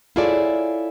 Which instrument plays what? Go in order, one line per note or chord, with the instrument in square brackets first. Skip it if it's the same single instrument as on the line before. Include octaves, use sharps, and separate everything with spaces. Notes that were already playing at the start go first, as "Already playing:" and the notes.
[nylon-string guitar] E4 F4 G#4 A4 C#5 D5